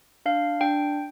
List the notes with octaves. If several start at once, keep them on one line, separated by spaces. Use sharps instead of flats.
D4 F5
D4 G5